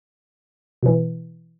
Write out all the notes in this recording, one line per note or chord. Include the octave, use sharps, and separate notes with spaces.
B2 E3